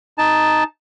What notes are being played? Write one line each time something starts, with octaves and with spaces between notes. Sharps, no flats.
D#4 A5